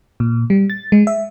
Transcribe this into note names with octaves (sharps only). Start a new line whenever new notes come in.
A#2
G3
A6
G#3
E5